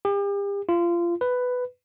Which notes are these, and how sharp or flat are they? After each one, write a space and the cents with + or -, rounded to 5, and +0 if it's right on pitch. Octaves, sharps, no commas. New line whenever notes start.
G4 +40
F4 -25
B4 +10